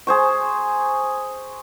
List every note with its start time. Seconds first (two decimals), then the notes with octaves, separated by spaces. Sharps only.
0.07 G#4 C5 C#6